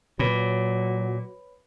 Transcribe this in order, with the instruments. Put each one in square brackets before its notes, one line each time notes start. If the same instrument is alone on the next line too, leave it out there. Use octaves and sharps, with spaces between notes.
[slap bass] A#2 [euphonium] F#3 [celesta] B4 C#5 B5